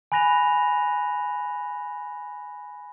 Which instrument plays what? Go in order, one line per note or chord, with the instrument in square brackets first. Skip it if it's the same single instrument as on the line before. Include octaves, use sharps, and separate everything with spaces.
[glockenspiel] G#5 B5 F#6 A#6 D#7 F7